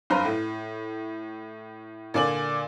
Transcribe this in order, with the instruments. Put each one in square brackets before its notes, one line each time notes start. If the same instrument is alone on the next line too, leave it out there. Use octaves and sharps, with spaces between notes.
[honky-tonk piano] F#1 G2 F4 B4 C5 A#5
A2
A#2 D3 D5 G#5 F#7